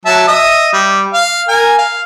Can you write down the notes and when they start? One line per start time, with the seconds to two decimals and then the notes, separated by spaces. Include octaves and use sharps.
0.05 F#3 E5 A5
0.28 D#5 E5 D#6
0.73 G3
1.13 F5
1.48 A#4 G#5
1.78 F5